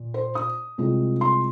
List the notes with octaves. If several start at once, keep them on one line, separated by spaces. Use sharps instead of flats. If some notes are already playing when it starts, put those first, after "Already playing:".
Already playing: A#2
C5
D#6
C2 C3 G#3 F4
C6